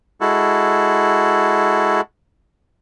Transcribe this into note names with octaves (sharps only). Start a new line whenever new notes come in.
G#3 E4 F#4 A4